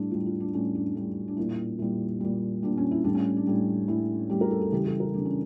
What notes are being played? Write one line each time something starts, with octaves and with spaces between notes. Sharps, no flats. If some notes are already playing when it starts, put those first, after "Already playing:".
Already playing: A2 G3 D4
A2 G3 F4
F4
D4
A2 G3 C#4
D4
A2 G3 D4
D4
A#2 G3 E4
A#2 G3 E4
A#2 G3
A#2 G3 D4
C#4
E4
A2 G3 D4
C#4
D4
A2 G3
A2 G3 E4
A2 G3 G4
A#4
A4
A4
C#3 E3 G3 G4
A4
A#4
C#3 E3 G3 D4
C#4